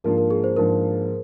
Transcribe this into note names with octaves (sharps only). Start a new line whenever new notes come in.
G#2 F3 A#3 D4 F4 A#4
A#4
G#4
C5
G#2 F3 A#3 D4 F4 A#4